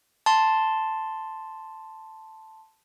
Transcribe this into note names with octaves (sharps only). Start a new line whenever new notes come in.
A5 C6